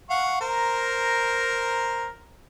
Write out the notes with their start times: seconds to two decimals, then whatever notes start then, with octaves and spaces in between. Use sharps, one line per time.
0.10 F5 F#5 C#6
0.41 A#4 C5 A#5